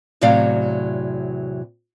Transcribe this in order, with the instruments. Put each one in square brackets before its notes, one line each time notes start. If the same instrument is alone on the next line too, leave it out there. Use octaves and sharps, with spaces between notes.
[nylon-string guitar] E2 A2 C3 F#3 D5 F5